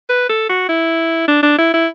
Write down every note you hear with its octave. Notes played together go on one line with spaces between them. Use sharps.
B4
A4
F#4
E4
D4
D4
E4
E4